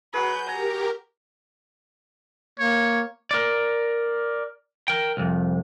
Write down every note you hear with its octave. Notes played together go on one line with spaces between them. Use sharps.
F#3 F#4 G#4 B4 G6
G4 A#4 G#5 A#5
A#3 C#5
A#4 D5
A#4 G5
C2 F2